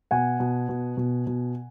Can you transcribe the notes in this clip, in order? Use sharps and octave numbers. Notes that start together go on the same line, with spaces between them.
B2 F#5 G#5
B2
B2
B2
B2